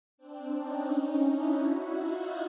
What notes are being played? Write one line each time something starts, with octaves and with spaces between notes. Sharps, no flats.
C4 D4
C#4 D#4
C#4 D#4
D4 E4
E4 F#4
D#4 F4